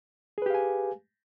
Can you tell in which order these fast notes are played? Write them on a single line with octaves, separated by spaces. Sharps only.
G#4 B4 G4 F5 G#5